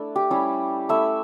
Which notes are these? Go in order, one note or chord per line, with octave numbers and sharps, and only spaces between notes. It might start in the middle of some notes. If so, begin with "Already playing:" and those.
Already playing: A3 D4 E4
G4
G3 C#4 E4
A3 E4 E5